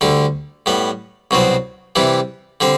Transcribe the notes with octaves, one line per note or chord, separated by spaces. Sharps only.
D2 D3 G3
A2 G3 B3
C2 B2 F#3 C4
C3 E3 G3
D3 G3 C4